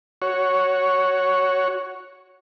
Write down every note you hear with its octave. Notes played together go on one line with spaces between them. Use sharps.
F#4 C#5